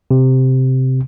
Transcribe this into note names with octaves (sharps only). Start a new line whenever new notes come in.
C3